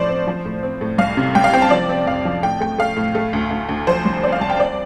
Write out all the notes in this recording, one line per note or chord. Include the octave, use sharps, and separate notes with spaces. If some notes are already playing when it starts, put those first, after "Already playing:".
Already playing: A2 F3 A3 C5 D5
C4
F3
A2
C4
A2
C2 F5
C3
C2 G5
F5
C4 G5
A5
F3 D5
C4
F2 F5
F3
A2 G5
A3 G5
A3 F5
A2
A3
D2
D2
D2
F3 C5
C2
C4 D5
F5
C2 A5
G5
C4 D5